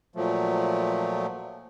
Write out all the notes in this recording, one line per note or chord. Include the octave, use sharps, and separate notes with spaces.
A#2 F3 F#3 A3